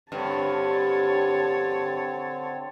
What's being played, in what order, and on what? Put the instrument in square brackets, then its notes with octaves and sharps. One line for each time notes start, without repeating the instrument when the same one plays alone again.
[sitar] G2 [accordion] D3 C4 [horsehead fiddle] C#5 A5